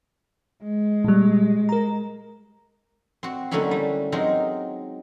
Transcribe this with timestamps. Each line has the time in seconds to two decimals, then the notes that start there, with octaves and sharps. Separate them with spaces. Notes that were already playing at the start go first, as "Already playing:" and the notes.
0.63 G#3
1.04 A#2 G3
1.69 A#4 A#5
3.23 C4 F#4
3.51 D3 F#3 A3 A#3 C#4 E4
3.71 G3
4.12 F#3 G#3 C4 D#4 A#4